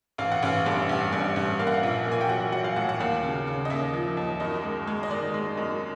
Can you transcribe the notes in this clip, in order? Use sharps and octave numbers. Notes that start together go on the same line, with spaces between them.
A1 F5
F#5
A1 F5
G2
A1
G2
A1
A#3 F5
F#5
F5
A#1
A#3
G#5
G5
F#3 F#5
F#3 F#5
F5
A2 F#5
F#5
D#2 F5
C#3
C#3
D#5
D#2 E5
F3
D#2
F#2 D#5
G#3
G#3
D#5
D#3 D5
G#3
F#2